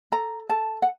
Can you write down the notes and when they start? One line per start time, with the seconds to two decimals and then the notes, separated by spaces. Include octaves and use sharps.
0.12 A4 A#5
0.49 A4 A5
0.82 F#5